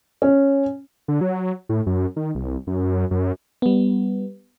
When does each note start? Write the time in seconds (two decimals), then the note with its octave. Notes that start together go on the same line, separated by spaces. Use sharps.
0.22 C#4
1.08 D3
1.21 F#3
1.69 A2
1.86 F#2
2.16 D#3
2.35 C2
2.67 F#2
3.11 F#2
3.62 G3 B3